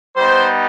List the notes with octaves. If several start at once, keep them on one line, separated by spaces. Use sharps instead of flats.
G3 B3 D#4 C5